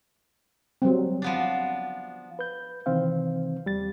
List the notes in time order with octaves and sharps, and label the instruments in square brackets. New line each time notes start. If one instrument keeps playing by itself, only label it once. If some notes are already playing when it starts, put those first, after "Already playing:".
[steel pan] F#3 G3 C4
[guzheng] F3 B3 D4
[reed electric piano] B4 G6
C3 D#3 E3 C4 F5
D#2 G3 A6